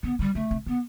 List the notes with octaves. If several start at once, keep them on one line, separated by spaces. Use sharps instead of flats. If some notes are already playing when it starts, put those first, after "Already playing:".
D3 B3
D3 G3
D3 A3
C3
D3 B3